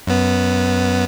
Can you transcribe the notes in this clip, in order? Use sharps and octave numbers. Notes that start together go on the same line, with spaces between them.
F#2 B3